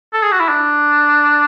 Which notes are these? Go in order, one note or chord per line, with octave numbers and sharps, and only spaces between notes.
A4
G#4
F#4
E4
D4